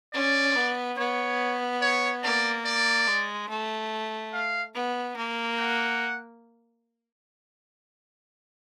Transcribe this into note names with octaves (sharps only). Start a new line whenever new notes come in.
C#4 D5
B3
B3 C#5
C#5
A#3 D5
D5
G#3
A3
F5
B3
A#3
F#5